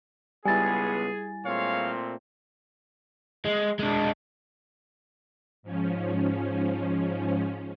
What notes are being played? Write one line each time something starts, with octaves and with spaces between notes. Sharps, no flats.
C#2 G3 B3 E4 G#4 G#5 A6
A#2 G#3 A3 C4 C#5 F5
G#3
G#3 D4
G#2 F3 C#4